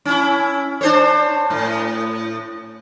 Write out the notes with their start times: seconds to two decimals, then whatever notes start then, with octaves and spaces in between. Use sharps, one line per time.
0.05 C#4 E4
0.81 D4 C5 C#5
1.50 A2